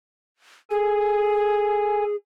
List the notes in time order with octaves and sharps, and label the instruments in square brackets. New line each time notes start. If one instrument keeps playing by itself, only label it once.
[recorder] G#4 [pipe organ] A4 G#5